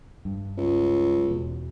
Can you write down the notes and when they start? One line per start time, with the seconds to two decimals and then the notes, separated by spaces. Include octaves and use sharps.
0.25 G2
0.57 C#2
1.28 E2 B2